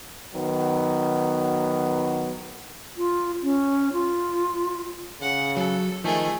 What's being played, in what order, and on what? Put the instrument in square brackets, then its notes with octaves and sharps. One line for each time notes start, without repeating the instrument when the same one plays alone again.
[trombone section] D#3 F#3 B3
[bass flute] F4
C#4
F4
[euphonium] C#3 [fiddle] F#5
[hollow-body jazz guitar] F#3 [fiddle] A4
[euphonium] D#3 [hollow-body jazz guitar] F3 [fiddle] A3 G#4